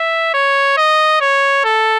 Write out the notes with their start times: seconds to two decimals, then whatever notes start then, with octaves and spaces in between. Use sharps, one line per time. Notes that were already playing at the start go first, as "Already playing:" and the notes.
Already playing: E5
0.34 C#5
0.77 D#5
1.21 C#5
1.65 A4